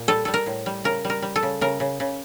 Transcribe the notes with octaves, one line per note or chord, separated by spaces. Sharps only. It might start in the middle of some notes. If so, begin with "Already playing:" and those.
Already playing: A#2
G3 A4
G3 A4
A#4
A2
G3
C#3 A#4
G3
A#4
G3
A4
C#3
C#3 A#4
C#3
C#3